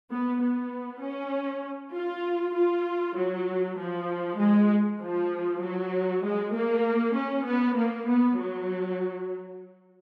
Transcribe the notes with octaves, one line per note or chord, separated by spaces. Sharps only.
B3
B3
C#4
F4
F4
F#3
F3
G#3
F3
F#3
G#3
A#3
C#4
B3
A#3
B3
F#3